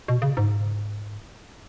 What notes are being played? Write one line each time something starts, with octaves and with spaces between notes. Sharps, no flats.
B2
C#3
G#2